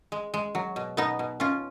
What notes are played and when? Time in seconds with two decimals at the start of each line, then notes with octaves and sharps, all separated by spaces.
0.12 G#3
0.34 G#3
0.55 F#3
0.76 B2
0.97 B2 B3 D#4
1.19 B2
1.40 B2 C#4 F4